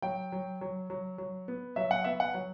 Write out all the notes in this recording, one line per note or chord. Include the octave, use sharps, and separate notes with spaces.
F#3 G5
F#3
F#3
F#3
F#3
B3
F#3 E5
F#5
B3 E5
F#5
F#3